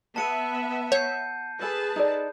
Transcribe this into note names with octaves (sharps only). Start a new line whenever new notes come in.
B3 E5 A5 C#7 D#7
C#5 F#5 G6 C7
G#4 A4 B4 G#5 A5
D#4 A4 D5